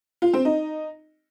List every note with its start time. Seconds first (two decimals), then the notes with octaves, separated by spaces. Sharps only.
0.22 F4
0.33 C4
0.45 D#4